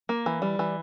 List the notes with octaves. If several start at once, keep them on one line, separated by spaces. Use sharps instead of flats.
A#3
E3
G3
E3